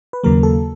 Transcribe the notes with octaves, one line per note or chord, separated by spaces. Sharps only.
B4
D#2 C#3 F#3 A#3 A#4
A4